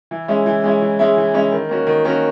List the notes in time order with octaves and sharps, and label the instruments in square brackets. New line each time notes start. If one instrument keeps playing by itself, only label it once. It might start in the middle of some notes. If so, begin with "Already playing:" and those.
[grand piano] E3
G#3 C#4 E4
E3
G#3 C#4 E4
E3
G#3 C#4 E4
E3
G#3 C#4 E4
D#3
A#3 C#4 F#4
D#3
A#3 C#4 F#4